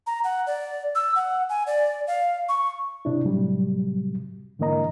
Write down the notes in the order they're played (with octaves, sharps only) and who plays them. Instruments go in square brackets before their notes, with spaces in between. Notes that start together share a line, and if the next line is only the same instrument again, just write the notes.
[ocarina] A#5
F#5
D5
E6
F#5
G#5
D5
F5
C#6
[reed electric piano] C3 D4 E4
A2 C3 F#3 G3
G#2 D3 E3 A#3 D#5 A#5